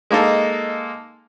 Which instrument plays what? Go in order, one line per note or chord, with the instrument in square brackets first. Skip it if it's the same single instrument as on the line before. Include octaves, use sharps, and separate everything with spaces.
[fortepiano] G#3 A#3 D#4 A4